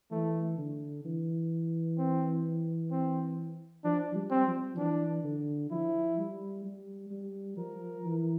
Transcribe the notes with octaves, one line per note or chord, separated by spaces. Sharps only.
E3 A3
D3
E3
C4
C4
F3 D4
G3
C4
F3
E3 D4
D3
F3 E4
G3
G3
G3
F3 A#4
E3